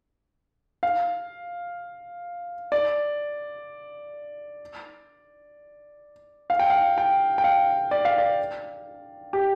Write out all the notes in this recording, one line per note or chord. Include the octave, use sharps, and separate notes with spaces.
F5
D5
F5
G5
F5
G5
G5
F5
D5
F5
D5
G4